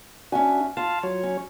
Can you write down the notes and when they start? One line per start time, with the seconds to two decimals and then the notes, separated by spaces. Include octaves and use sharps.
0.32 C#4 D4 F#4 E5 G#5
0.77 F4 F5 A5
1.03 F#3 C#5
1.23 C#4